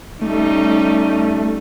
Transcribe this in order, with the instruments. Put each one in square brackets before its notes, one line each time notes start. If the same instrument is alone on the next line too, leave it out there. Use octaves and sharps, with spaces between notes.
[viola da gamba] G3 C#4 D#4 [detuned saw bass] A3